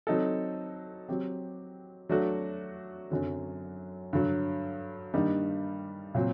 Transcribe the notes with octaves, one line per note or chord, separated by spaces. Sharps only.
F#3 C4 D#4 A4
F#3 C4 G4
F#3 A3 D4 F#4
F#2 D3 F#3 C4
G2 D3 F#3
G2 D#3 G3 A#3 D#4
A#2 F#3 C4